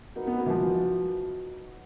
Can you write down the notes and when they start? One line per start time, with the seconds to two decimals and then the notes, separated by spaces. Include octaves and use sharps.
0.15 A#3 D#4 F#4 B4
0.27 B3
0.39 A#3
0.46 E3
0.50 F3